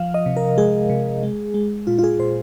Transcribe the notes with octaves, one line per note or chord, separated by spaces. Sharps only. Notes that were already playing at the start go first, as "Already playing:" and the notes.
Already playing: F3 F5
D#5
C3
A#4
G#3 G#4
C3
G#3
G#3
A#2 F4
F4
G#4
A#2 C5